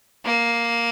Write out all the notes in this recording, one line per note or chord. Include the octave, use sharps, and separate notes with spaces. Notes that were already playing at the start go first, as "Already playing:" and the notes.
A#3